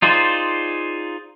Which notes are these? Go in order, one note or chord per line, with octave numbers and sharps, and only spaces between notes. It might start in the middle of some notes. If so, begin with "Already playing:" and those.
D#4 F4 G#4 C5 D5